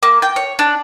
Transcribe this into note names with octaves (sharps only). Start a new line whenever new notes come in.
A#3
G5
C#5
D4